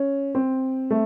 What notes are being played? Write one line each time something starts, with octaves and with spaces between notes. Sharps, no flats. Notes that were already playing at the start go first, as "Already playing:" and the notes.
Already playing: C#4
C4
A3